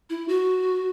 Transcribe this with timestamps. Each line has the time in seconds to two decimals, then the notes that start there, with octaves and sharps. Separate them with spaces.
0.10 E4
0.28 F#4